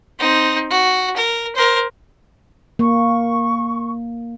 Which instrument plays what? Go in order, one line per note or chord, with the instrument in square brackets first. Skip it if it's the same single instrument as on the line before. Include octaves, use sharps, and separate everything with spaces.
[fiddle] C4 D#4
F#4
A#4
A#4 C5
[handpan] A#3 [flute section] C#6